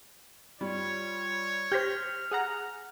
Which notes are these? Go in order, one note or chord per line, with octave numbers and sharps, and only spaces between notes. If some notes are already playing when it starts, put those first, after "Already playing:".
G3 F4 C#5
G4 C5 F6 G6 A#6 B6
G#4 F#5 A#5